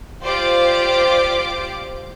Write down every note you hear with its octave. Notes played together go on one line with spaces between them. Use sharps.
F4 G4 C5 D5 D6